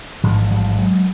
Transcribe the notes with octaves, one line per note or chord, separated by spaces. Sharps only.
A1 G#2 D#3 F3
F3 G3
F#3 G#3